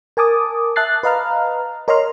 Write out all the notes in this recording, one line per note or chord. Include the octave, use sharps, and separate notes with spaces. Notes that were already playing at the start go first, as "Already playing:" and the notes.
A#4 G#5 A5 D6 D#6
E5 A5 F#6 A6 C7
B4 D#5 F5 A#5 F6
A#4 C#5 D#5 A#5 C6 F6